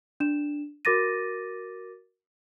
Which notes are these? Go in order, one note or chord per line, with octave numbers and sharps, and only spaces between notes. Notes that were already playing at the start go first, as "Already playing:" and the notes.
D4 E7
F#4 A#4 D6 A6 A#6 D#7